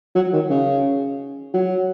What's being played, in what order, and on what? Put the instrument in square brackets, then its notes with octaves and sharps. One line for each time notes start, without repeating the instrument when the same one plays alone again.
[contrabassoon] F#3
D#3
C#3
F#3